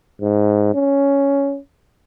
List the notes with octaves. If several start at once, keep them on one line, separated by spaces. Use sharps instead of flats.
G#2
C#4